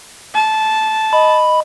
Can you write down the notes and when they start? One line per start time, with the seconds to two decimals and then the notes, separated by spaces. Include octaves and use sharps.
0.35 A5
1.13 D#5 B5